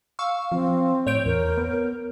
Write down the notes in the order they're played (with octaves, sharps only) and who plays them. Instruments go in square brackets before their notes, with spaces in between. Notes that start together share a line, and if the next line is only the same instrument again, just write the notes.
[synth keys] F5 C#6 E6
[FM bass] F3 [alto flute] C4
[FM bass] A2 [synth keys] C#5 G6 D7
[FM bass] E2 [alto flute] A#4
[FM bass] B3